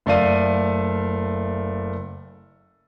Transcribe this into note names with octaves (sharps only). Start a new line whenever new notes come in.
F#1 A3 A4 D5 F5 D#7